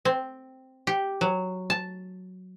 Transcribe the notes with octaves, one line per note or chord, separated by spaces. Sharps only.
C4
G4
F#3
A5